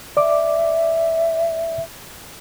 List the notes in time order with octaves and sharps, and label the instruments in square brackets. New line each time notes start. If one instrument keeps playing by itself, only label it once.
[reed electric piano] D5 D6 [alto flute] E5